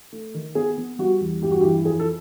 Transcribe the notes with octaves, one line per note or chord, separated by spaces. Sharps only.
A3
D#3
B3 G#4
B3
G3 F#4
E2
G2 G4
F#4
G4
E3
F2 G#4
A4